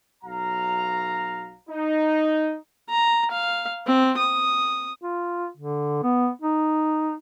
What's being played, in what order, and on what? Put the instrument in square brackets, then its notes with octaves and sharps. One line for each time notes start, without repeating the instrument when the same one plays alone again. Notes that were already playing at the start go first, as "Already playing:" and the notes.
[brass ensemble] B1 F#3 F5 A#5
D#4
[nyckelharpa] A#5
F5
C4
D#6
[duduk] F4
D3
B3
D#4